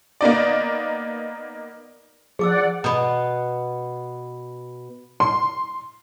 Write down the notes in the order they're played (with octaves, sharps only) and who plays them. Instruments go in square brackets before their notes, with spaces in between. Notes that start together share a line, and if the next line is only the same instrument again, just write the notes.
[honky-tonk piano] A#3 B3 D#4 D5
[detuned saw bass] F3 [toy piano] G#4 D6 E6 [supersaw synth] D5 F#5
[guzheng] B2 B3
[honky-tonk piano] C6